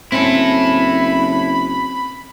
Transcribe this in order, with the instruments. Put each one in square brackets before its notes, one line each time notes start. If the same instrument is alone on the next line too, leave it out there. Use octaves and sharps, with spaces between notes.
[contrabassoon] F#1 [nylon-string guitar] C4 C#4 [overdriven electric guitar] E4 A4 [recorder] B5